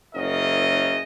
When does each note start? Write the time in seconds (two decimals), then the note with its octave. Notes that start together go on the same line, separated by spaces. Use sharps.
0.14 F#1 C#3 E4 A#4 D#5